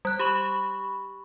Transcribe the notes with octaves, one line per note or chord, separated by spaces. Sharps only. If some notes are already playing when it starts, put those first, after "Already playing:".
G3 F#6
G4 B5 C#6